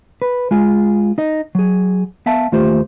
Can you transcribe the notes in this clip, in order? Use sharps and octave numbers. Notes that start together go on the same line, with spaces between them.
B4
G#3 F4 G#4
D#4 D#5
F#3 G#4
B3 E5 F5 A5
D#2 A3 F4 G4 C5